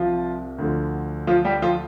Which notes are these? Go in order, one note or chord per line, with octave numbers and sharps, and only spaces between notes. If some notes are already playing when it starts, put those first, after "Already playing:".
Already playing: C2 C3 F3 F4
D2 D3 F3
F3 F4
G3 G4
F3 F4